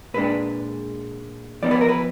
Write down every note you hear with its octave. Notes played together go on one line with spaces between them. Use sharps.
A#2 G#3 D4 B4
F3 B3 D#4 D5
B4
A#4
B4